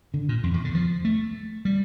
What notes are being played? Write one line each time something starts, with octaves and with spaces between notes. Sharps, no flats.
D3
A#2
F2
E2
D3
F3
A3
G3